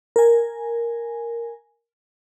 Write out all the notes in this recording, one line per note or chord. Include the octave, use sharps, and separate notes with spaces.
A#4 G#5